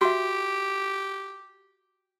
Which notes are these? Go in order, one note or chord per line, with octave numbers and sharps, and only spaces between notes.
F#4 G4 E5